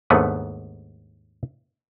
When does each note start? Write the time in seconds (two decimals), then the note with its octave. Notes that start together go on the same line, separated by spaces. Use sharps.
0.10 D#2 G#2 A3 B3 D4 B4